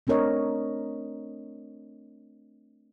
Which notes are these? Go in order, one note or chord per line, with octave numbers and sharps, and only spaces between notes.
A3 C4 D4 A#4 C#5 D#5